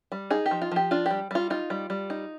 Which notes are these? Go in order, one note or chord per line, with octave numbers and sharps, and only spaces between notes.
G3
D#4 G#4
G4
F3
F4
F3 G4
D4 F4
G3 G4
G3 F4
D#4 F4
G3
G3
D#4